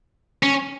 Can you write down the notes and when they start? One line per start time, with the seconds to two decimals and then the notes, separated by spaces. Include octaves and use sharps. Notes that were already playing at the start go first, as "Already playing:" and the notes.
0.43 C#4